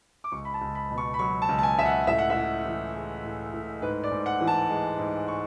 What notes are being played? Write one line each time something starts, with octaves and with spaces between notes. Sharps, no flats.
D6
C#2 C#6
B5
A5
C#2
B5
B2
C#6
B5
F#3 C#6
A5
C#2
A5
G#5
C#2 E5
F#5
A2 E5
F#5
E5
A2
E3
G#3
A2
A2
G#2 B4
D5
G#2
F#5
E3
A5
G#3
G#2
C#6